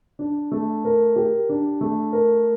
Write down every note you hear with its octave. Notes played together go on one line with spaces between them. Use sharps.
D4
A3
A#4
G4
D4
A3
A#4